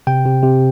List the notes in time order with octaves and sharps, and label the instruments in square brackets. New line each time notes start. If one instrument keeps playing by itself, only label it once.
[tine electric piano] C3 G5
C3
C3